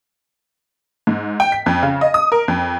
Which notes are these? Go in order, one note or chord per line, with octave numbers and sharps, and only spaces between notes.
G#2
G5
B6
F2
C#3
D#5
D#6
A#4
F2